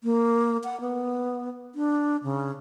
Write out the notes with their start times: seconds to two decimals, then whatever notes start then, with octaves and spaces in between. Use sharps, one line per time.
0.04 A#3
0.64 F#5
0.81 B3
1.75 D4
2.24 C#3